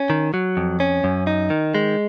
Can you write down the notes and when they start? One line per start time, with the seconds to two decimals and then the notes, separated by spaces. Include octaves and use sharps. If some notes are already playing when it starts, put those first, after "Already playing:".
Already playing: C#4
0.10 D#3
0.34 F#3
0.57 F2
0.80 C#4
1.04 F#2
1.27 D#4
1.50 D#3
1.74 G#3